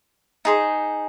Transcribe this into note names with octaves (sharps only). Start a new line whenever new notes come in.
D#4 G#4 C5